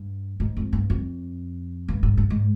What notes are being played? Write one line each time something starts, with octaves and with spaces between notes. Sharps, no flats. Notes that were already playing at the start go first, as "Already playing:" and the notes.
Already playing: G2
G#2
F2
G2
F2
G2
G#2
G2
G#2